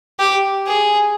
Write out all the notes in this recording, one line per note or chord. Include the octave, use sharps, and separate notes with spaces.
G4
G#4